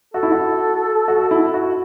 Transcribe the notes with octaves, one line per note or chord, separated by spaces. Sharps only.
F#4 A4
E4
F#4
F#4
E4
F#4